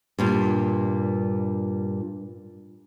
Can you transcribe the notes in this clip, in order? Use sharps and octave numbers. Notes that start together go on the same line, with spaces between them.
G2 A#2 G3